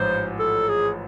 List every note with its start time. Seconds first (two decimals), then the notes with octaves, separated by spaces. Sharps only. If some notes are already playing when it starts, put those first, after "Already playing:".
Already playing: A1 G#2 F3 C5
0.39 A4
0.69 G#4